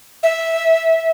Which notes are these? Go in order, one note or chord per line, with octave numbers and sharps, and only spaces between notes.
E5